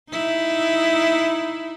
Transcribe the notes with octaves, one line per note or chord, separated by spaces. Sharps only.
D#4 E4